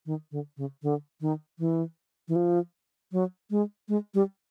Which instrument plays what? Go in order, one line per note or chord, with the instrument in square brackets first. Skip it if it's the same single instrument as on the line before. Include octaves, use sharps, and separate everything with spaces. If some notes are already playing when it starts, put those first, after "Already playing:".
[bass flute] D#3
D3
C#3
D3
D#3
E3
E3
F3
F#3
G#3
G#3
G3